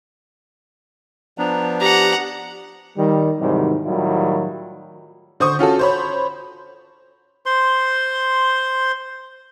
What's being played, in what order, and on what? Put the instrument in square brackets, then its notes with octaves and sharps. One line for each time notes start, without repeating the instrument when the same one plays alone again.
[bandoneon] F3 B3 D4 [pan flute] A#5
[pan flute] G4 [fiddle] F#5 A#5
[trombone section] D#3 G3
G#2 C3 D#3 E3 F#3 G3
A2 D#3 F#3 G3 E4 F4
[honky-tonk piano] D3 C5 C#6 D#6
C#4 F4 F#4 A4
C5 C#5 B5
[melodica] C5 C6